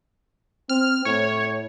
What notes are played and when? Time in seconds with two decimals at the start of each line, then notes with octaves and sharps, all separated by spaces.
0.69 C4 F6
1.05 A2 C#5